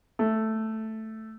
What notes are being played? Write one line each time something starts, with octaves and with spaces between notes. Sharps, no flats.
A3